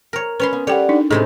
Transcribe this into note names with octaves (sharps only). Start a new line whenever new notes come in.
A#4 C#5
C#4 B4 C#5 B5 C6
B3
G3 A4 C#5 F#5 G5
D4 D#4
A2 C3 G#3 D#4 G#4